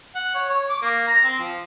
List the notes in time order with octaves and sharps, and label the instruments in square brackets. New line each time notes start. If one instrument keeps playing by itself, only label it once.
[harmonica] F#5
C#5
C#5
D6
A#3
A#5
C4
F3